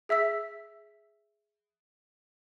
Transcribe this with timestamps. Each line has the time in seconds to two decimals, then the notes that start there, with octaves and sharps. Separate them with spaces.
0.09 G#4 E5 E6 B6